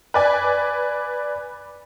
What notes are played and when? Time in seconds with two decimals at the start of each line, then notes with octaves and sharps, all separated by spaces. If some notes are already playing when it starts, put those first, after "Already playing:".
0.14 B4 D5 G#5